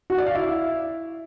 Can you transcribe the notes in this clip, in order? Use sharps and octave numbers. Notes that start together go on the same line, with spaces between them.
F#4
D5
F5
E4